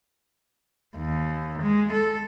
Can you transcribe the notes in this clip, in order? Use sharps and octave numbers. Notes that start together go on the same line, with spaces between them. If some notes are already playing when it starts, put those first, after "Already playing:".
D#2
G#3
A4